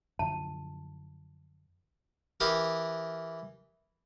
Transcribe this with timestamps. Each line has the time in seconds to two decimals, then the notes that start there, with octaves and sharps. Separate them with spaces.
0.19 F#2 D3 F3 A5
2.40 E3 G4 A#4 D#6